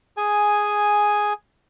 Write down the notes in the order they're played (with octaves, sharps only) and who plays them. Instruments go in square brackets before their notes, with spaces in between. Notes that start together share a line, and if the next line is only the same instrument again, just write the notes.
[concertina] G#4 G#5